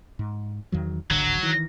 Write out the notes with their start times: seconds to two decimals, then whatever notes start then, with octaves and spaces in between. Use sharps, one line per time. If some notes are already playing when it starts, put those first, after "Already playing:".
0.19 G#2
0.72 E2 D#3 F#3
1.11 D1 G#1 D3 F#3
1.43 D#3 E3